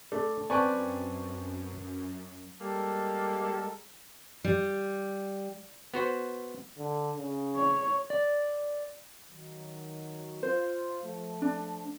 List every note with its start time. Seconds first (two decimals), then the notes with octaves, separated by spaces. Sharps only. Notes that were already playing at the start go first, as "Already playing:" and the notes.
0.12 A3 D4 A4
0.50 F#2 C4 D4 B4 D5 G5 G#5 C#6
2.60 G3 G#3 A#3 A4 A#4
4.44 G3
5.94 B3 F#4 C5
6.78 D3
7.17 C#3
7.56 C#5
8.10 D5
9.29 D#3 F#3
10.43 F4 C5
11.03 F3 A3
11.42 D4